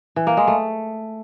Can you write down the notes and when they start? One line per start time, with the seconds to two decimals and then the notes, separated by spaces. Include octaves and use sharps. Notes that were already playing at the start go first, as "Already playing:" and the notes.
0.16 E3
0.27 A#3
0.37 G#3
0.48 A3